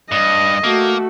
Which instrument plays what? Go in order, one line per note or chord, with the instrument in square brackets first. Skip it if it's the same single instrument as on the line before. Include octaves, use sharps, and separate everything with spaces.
[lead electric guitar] G2 [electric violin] D#5
[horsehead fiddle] A3 F#4 [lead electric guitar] A#3